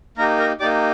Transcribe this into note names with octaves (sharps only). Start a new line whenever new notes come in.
A#3 D#4 G4 A#4 A#5
A#4 A#5
A#3 D#4 G4 D5 D6